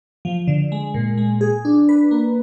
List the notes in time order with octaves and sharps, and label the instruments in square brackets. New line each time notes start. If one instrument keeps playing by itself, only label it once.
[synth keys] F3
D3
G#3
A#2
G#3
G#4
D4
B4
A#3